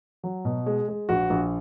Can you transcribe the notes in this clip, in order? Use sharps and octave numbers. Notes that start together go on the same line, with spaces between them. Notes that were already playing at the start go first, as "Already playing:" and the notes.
F#3
B2
G#3
G#3
A#1 F#4
A#1